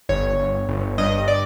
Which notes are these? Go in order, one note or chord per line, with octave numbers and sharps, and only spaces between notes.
G1 C#5
G1
G1
G2 D#5
D5